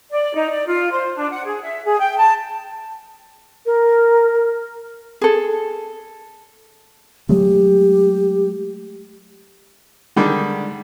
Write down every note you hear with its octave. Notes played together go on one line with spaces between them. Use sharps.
D5
D#4
D5
F4
C5
D4
F#5
G#4
E5
G#4
G5
A5
A#4
G#4 A4
F#3 G#3 A3 G4
D3 D#3 G3 G#3